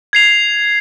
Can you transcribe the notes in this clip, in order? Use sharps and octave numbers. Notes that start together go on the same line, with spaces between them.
G#6 C7 F7